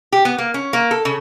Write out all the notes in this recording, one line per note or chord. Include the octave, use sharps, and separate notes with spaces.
G4
B3
A#3
C#4
A#3
A4
C#3